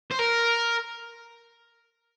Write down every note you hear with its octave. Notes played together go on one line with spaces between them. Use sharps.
C5
A#4